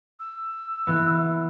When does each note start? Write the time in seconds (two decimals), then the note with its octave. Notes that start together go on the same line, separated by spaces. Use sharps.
0.20 E6
0.87 E3 B3